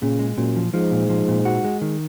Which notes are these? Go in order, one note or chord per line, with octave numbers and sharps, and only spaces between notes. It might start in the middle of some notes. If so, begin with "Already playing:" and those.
A#2 C#3
G#3
F#2 A#2
F3
G#2 F3
A#2
F3
A#2
F#4
G#3
D#3